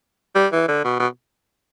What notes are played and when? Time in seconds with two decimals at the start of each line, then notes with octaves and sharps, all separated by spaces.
0.35 G3
0.52 E3
0.68 D3
0.84 B2
1.00 B2